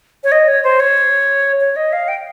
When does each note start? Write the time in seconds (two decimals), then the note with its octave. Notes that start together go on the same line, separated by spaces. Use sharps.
0.24 C#5
0.32 D#5
0.48 C#5
0.64 C5
0.80 C#5
1.61 C#5
1.76 D#5
1.93 F5
2.08 G5